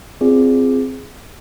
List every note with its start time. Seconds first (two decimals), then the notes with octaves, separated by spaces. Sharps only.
0.21 C4 F4 G#4 D5